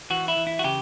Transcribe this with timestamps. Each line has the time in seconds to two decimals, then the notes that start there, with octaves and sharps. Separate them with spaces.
0.10 E3 F#4
0.28 E4
0.37 E3
0.47 E4
0.59 F#4
0.64 C#3 G4